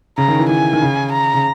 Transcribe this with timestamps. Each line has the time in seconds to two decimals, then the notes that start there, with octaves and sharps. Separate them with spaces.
0.18 C#3 A#5
0.28 D#3
0.39 E3
0.49 E3 G#5
0.73 D#3
0.82 C#3
1.13 A#5
1.34 C#3